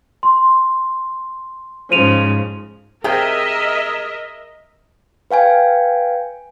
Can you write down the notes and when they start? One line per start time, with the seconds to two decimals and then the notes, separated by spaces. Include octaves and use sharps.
0.23 C6
1.91 G#2 C#3 F3 C5 D#7 F7
3.04 C3 G#4 A#4 D#5 E5 G5
5.31 B4 F5 G5 G#5